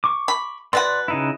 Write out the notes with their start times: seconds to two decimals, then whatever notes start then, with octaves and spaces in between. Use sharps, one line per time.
0.04 C#6 D6
0.28 B5
0.73 B2 B4 D5 F#5 C6
1.08 C#3 D#4 E4